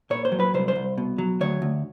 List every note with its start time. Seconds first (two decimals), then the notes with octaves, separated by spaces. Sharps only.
0.10 A#2 C#5
0.25 C5
0.32 F#3
0.40 B4
0.54 C2 C5
0.68 C5
0.75 C2
0.98 B2
1.18 F#3
1.41 D2 C#5
1.62 D2